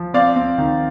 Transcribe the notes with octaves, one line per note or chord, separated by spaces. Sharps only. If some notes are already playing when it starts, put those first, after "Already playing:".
Already playing: F3
C4 D5 F5
C4
D#3